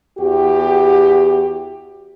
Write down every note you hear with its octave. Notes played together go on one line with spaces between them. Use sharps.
E2 F#4 G4